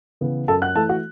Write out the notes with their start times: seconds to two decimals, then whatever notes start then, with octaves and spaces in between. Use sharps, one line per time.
0.21 C#3 E3 B3
0.48 F#2 A4 A5
0.62 F#5 F#6
0.75 E3 A3 A4 A5
0.89 F#4 F#5